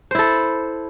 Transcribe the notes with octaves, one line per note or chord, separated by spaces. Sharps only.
E4 A4 C5